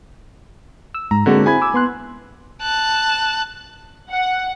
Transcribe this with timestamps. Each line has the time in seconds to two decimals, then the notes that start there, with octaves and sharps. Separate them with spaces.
0.94 E6
1.11 G#2 A#5
1.26 D3 G#3 A#3 C4 F#4
1.46 C4 E4 G#4 G#5 B5 G#6
1.61 D6 E6
1.74 B3 C6 F#6
2.62 A5 F#6
4.12 F#5